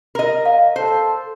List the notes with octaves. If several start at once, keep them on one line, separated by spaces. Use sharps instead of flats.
A#4 D#5
F5
A4 C5